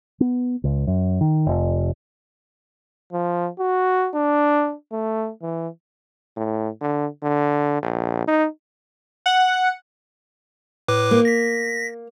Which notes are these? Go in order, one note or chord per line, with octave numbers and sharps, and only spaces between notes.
B3
C#2
F#2
D#3
F1
F3
F#4
D4
A3
E3
A2
D3
D3
A#1
D#4
F#5
A2 B4 D6
A#3
A#6 B6